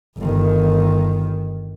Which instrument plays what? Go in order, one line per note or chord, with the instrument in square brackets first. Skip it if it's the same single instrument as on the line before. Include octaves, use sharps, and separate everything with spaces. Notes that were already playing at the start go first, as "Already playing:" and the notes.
[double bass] G1 D#3